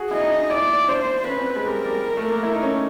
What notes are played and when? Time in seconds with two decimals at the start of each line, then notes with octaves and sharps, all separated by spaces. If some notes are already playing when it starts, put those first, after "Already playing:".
Already playing: F#4 G#4
0.11 E4 D#5
0.20 D#4
0.30 D4
0.40 D#4
0.49 E4 D5
0.88 D4 C5
1.27 C#4 B4
1.37 C4
1.56 G#3
1.66 G3 A#4
1.85 G3
2.17 A3
2.30 A#3
2.43 E4
2.53 D#4
2.62 C#4